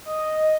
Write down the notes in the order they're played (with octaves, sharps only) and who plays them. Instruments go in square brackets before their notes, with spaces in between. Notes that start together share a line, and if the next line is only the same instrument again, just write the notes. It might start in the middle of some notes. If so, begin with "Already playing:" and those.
[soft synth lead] D#5